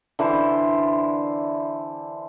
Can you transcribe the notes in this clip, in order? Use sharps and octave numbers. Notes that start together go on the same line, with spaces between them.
D3 E3 C5